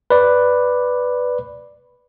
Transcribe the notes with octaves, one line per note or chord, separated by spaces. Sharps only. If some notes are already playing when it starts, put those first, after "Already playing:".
B4 D5